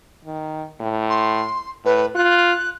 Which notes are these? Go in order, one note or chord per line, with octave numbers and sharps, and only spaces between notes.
D#3
A2
C6
A2 B4
F4 F#6